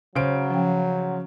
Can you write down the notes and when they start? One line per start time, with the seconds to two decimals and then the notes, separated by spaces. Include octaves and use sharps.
0.15 C#3 F#3 C5 D7
0.50 F3 C#4 G5